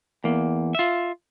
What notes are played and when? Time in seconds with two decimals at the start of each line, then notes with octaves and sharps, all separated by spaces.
0.24 E2 A#3
0.75 F4 E5